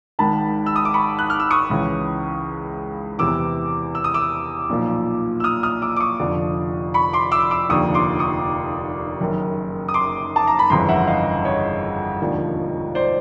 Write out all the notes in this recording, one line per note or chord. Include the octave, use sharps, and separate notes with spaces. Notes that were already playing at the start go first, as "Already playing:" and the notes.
G#1 G#2 D#3 A5 B5
E6
D#6
D6
B5 C#6
F#6
F6
E6
C#6 D#6
C#2 C#3 E3
E2 C3 E3 D6 E6
E6
D#6
D6 E6
B1 A#2 F3
E6
D#6 F6
D#6 F6
D6 E6
D6
C#6 D#6
F1 F2 D3 F3
B5 C#6
C6 D6
D6 E6
D6 E6
F1 D#2 D3 F3 C#6 D#6
C6 D6
C#6 D#6
F#1 F#2 D#3
D#6
C6 D6
A5
A#5
B5
G1 F2 C#3 E3 A#5 C6
E5 F#5
D#5 F5
C#5 D#5
E1 D#2 D3 F3
C5 D5